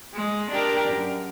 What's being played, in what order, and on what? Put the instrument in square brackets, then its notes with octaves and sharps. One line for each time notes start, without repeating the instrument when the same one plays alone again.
[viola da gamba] G#3
D4 G4 A#4
F#2